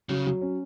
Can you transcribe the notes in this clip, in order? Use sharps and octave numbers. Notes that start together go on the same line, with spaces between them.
C#3 F#3
F#3
C#4